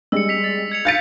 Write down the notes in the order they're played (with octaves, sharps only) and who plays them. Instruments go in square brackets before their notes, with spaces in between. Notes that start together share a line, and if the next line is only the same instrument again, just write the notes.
[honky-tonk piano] G3 G#3 [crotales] E6 C#7
[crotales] B6 F7
A6
G#6 C#7 F7
[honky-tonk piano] F5 A6 C#7 [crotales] G6 B6